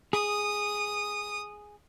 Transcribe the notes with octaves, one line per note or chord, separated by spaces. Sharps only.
G#4 D#6